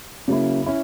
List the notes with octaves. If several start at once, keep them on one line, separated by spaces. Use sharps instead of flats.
C#3 F#3 A#3 E4
C#4 E4